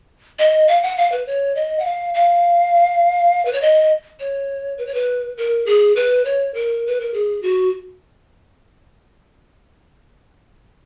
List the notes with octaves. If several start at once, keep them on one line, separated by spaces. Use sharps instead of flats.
D#5
F5
F#5
F5
B4
C#5
D#5
F#5
F5
F5
B4
C#5
D#5
C#5
B4
C#5
B4
A#4
G#4
B4
C#5
A#4
B4
A#4
G#4
F#4